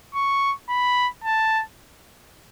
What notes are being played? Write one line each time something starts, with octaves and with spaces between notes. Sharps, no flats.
C#6
B5
A5